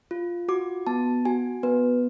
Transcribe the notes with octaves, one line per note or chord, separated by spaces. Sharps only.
F4
F#4 D6
B3 A5
F#4 G#5
B3 B4